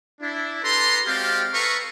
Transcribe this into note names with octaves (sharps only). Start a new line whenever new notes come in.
D4 E4
G4 A4 B4 A#5 C6
G#3 C4 F#4 G4 D5 F5
A4 B4 F5 A#5 C#6